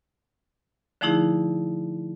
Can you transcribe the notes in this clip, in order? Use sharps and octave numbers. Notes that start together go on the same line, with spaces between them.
D3 F3 A3 D#4 E4 G#4